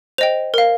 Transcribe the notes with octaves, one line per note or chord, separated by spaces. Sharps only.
C5 D#5 G5 F7
A#4 F5